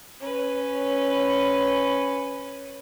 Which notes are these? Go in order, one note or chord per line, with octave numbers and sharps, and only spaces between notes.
C#4 B4